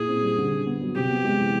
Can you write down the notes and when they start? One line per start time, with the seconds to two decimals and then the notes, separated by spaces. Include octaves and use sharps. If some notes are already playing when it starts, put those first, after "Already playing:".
Already playing: A#2 E4 G#4
0.08 C4
0.22 G3
0.37 D3
0.52 D3
0.66 B3
0.81 F#3
0.95 C3 G4
1.10 B3
1.25 G#3
1.39 E3